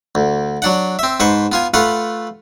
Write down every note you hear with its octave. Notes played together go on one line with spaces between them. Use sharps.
D2
F#3 D4 F#5
C4 E5
G#2 B4 C5 C#6
B3 F4 G#5
A3 F4 B4 F#5